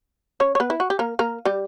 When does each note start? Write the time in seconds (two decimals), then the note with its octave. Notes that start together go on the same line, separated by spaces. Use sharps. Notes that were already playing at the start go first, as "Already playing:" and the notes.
0.40 C#4 C#5
0.55 C#5
0.60 B3 B4
0.70 E4
0.80 F#4
0.90 G4
0.99 A#3 A#4
1.19 A#3 A#4
1.45 G3 G4